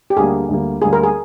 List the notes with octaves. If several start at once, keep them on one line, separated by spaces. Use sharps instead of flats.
G4
D2 D3 G3 A#3 G#4
D2 D3 G3 A#3
D2 D3 G3 A#3 G#4
A#4
G#4